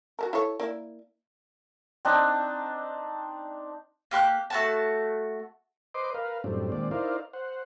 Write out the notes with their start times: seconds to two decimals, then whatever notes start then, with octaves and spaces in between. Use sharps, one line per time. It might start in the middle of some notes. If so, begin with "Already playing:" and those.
0.19 F#4 A4 A#4
0.33 E4 A4 C#5
0.60 A#3 E4 D5
2.05 C4 D4 D#4
4.11 A#3 G4 C6 F#6
4.50 A3 F#4 A5
5.95 B4 C5 D#5 C6 D6
6.14 A#4 B4 F5
6.44 F#2 A2 G3 C4 D4
6.72 D#2 A#2 G#3 C4 D5
6.91 D#4 E4 A#4 C5 D5 F5
7.33 C5 F#5